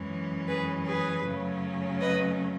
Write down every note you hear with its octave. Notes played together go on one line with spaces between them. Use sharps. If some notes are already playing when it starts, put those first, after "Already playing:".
Already playing: F#2 E3 G#3 C#4
G#4 B4
G#4 B4
F#2 C#3 F#3 A3 C#4
B4 D#5